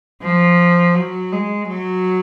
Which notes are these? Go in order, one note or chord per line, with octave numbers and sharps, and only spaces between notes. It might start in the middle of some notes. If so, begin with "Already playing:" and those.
F3
F#3
G#3
F#3